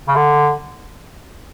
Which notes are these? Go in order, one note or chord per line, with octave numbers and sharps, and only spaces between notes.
C#3
D3